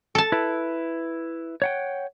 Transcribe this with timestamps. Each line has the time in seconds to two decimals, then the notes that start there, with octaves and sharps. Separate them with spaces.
0.15 A4 A5
0.32 E4 B4
1.62 C#5 F#5 G5